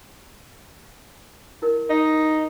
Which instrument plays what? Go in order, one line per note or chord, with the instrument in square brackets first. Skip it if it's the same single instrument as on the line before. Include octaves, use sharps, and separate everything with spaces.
[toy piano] E4 A#4
[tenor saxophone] D#4